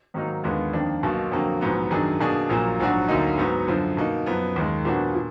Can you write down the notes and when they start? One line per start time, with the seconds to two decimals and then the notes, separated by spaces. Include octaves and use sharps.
0.14 G#2 D#3 F#3 A#3 D#4
0.44 D#2 D3 G#3 B3 F4
0.73 F2 D#3 A#3 D4
1.03 B1 B2 A#3
1.32 F2 D3 F#3 A#3
1.61 A#1 G#2 F#3 B3
1.90 F#2 D#3 F#3 D4 G#4
2.20 B2 A#3 D4 G#4
2.49 A#1 A#2 F#3 A#3
2.80 A#1 G#2 F#3 D4 F#4
3.08 D2 D3 F#3 A#3 D#4
3.38 G#2 F#3 B3
3.67 F#2 D3 F3
3.97 B2 A#3 D#4
4.26 F#2 F3 B3
4.56 D#2 D#3 G#3
4.85 A#2 F3 B3 D4 F#4
5.15 A#2